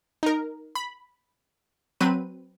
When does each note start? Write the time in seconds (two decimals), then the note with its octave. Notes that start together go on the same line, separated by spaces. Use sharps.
0.23 D#4 A#4
0.75 B5
2.00 F#3 C4 B4 D#7